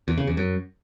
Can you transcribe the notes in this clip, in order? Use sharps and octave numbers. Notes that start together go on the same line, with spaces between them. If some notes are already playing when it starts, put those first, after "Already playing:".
E2
C#3
E2
F#2